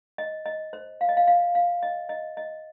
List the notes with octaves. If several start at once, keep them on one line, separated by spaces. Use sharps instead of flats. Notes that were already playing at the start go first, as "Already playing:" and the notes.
D#5
D#5
C5
F5
D#5
F5
F5
F5
D#5
D#5
D#5